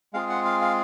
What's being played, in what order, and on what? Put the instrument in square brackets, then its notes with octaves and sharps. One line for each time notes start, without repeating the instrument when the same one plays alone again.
[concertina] G#3 C4 F4 G#4 F5
F#5
F5
F5